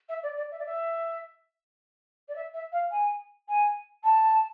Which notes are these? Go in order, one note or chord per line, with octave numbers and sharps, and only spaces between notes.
E5
D5
D5
E5
D5
E5
D5
E5
E5
F5
G#5
G#5
A5